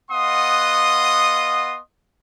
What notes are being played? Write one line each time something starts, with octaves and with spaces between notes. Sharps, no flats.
B3 D#5 F5 F#5 C6 D#6